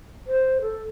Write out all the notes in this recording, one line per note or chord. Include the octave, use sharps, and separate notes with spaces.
C5
A4